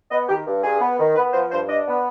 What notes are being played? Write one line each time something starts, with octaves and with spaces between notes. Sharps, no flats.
B3 D#5
D#3 G4
G2
G2 G#4
B3
D#3
B3 B4
F3 C5
G2 C5
D4 D#5
B3